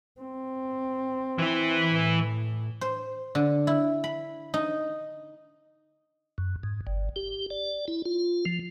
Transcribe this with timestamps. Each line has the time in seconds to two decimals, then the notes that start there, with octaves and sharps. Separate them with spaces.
0.21 C4
1.39 E3 E4
1.90 A2
2.81 C5
3.35 D3
3.67 E4
4.04 B5
4.54 D#4
6.38 F#2
6.63 G#2
6.87 G1
7.16 G4
7.50 D5
7.88 E4
8.05 F4
8.46 F3